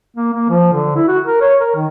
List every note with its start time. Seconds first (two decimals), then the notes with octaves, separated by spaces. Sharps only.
0.17 A#3
0.33 A#3
0.49 F3
0.73 D3
0.96 E4
1.08 F#4
1.26 A#4
1.41 C#5
1.60 A#4
1.76 D#3